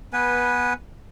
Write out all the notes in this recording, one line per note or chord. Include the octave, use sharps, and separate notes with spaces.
B3 B4 G#5